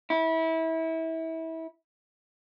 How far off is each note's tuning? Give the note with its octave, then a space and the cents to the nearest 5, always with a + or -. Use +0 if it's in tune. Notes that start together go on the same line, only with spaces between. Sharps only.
E4 -25